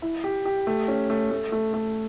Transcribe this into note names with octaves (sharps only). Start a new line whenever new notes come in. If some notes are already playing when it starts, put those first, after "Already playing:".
E4
G4
G4
A3
C#4
A3
A3
A3
A3